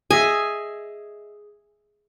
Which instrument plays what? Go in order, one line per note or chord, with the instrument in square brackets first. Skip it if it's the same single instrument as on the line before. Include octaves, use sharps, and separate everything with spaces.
[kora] G#4 D#5 E5 [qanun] G#5